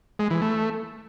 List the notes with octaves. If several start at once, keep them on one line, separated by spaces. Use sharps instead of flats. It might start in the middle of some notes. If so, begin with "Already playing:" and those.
G#3
E3
A3